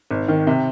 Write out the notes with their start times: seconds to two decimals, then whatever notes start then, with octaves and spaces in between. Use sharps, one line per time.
0.11 G#1
0.28 D#3
0.47 C3